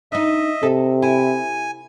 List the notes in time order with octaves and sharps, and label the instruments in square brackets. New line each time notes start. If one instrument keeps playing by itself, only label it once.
[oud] D4 D#4 [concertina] D#5 E5
[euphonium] C3 [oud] A4
[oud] E4 [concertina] G#5